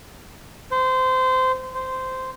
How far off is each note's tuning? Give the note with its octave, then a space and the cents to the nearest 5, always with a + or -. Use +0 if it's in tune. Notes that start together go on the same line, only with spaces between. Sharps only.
C5 -20
C5 -10